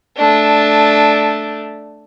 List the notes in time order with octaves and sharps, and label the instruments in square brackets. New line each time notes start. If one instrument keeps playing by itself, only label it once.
[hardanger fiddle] A3 D4